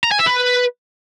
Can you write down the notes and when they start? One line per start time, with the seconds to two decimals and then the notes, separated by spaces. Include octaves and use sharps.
0.04 A#5
0.11 G#5
0.19 E5
0.27 B4